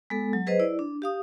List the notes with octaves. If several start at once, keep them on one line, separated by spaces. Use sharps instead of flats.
G#3 B3 A4
F#3
G#4 B4 C5 D#5
E4 D5
D4
G4 F5 D#6